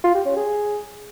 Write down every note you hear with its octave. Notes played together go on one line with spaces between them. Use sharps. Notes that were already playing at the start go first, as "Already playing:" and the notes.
F4
G4
C#4
G#4